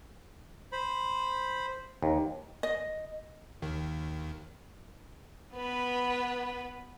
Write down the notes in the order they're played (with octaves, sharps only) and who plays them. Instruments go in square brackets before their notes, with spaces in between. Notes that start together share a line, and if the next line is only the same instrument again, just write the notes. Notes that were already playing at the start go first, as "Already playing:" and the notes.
[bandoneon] C5 B5
[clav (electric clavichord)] D#2
[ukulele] D#5
[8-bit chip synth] D#2 D#3
[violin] B3 B4